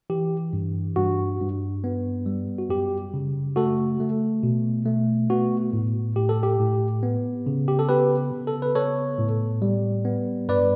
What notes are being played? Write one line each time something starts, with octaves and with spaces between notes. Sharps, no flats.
E3 G4
G2
G2 F#4
G2
B3
G3
F#4
F#2 G4
C#3
A3 F#4 A4
A3
B2
A3
B3 F#4
A2
A2 G4
A4
G4
A2
B3
C#3
G4
A4
B3 G4 B4
C#3
A4
B4
B3 A4 C#5
A2
G3
B3
G2 B4 D5